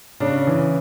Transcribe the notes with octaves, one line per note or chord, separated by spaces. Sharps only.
C#3 D4
E3